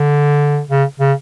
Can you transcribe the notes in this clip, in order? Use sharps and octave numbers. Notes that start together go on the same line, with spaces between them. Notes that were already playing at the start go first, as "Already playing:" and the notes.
Already playing: D3
C#3
C#3